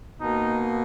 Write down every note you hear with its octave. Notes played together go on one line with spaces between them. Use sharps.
B2 A#3 D#4